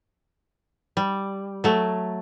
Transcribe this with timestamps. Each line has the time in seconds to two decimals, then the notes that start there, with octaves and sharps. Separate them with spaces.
0.97 G3
1.64 F#3 A3